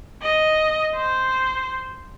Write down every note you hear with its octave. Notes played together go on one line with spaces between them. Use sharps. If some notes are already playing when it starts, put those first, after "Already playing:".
D#5
C5